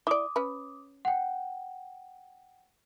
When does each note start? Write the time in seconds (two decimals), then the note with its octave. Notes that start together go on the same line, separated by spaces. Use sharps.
0.07 E4 D5 D6 D#6
0.36 C#4 B4
1.05 F#5 G5